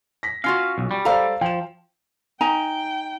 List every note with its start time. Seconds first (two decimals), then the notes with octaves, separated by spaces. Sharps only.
0.23 A#6 B6
0.44 C#4 F4 F#4 F5
0.78 B1
0.91 G3
1.05 A4 C5 D5 F5 A#5
1.41 F3 G5 E7
2.41 D#4 G5 G#5 A#5